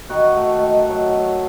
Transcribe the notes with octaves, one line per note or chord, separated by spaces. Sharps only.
D#3 F#4
A3
D#3
F#3
F#3